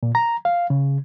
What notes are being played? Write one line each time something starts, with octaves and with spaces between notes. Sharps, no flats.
A#2
A#5
F5
C#3